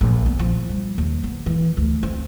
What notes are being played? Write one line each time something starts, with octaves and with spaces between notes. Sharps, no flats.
A#1
B3
F3
G3
D#2
B3
E3
D2
C4